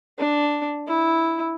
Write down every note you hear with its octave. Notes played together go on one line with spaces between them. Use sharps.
D4
E4